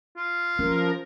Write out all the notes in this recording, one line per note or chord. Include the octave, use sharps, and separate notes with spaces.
F4
F3 C#4 A#4